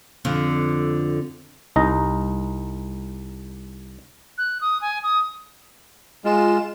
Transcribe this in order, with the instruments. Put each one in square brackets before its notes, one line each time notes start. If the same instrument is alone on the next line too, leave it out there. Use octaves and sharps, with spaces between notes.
[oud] F2 D3
[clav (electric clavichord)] C2 D#4 A#5
[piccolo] F#6
D#6
G#5
D#6
[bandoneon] G#3 [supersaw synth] F4 E7